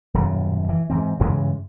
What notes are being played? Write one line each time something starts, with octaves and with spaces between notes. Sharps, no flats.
D#1 F#2 B2
E3
G#2 E3 C4
G2 C#3 E3 G#3